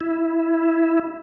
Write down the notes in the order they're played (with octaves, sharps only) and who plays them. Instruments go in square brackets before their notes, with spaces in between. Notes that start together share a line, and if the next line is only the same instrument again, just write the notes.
[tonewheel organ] E4